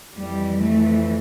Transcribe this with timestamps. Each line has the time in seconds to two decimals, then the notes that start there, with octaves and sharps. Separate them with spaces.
0.16 F2 E3 G3
0.60 A3